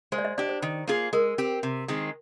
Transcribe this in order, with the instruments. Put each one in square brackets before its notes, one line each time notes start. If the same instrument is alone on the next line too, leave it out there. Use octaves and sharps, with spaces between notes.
[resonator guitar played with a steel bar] G#3 [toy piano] C5
[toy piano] D5
D#5
[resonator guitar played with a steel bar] D4 G4 [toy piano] D5
[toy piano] C5
[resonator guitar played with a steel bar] D#3
A#3 F4 G#4
[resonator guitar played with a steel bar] G#3 [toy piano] A#4
[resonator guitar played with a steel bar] C4 G4
C3
D#3 G#3 C4